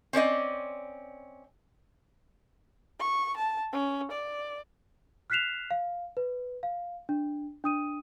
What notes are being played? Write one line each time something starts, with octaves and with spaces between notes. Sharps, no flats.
C4 C#4 D5 D#5
C#6
A5
C#4
D5
F6 F#6 B6 C7 E7 F7
F5
B4
F5
D4
D4 D#6 D#7